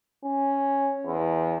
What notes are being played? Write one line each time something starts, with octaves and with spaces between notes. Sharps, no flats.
C#4
E2